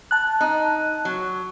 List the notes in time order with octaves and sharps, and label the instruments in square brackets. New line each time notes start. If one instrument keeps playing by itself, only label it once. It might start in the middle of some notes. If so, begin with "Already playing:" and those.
[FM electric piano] A5 F#6
[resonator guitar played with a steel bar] D#4
F#3